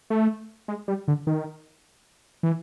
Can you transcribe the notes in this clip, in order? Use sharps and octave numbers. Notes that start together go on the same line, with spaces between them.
A3
G#3
G3
D3
D#3
E3